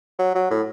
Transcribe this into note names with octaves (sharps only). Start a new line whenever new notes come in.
F#3
F#3
A2